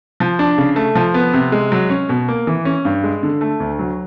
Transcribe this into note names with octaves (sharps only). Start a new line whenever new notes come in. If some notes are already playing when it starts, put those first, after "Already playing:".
F3
D4
C#3
A3
F3
B3
C3
G#3
F#3
C#4
B2
A#3
E3
C#4
G2
G#3
D3
A3
D2
F#3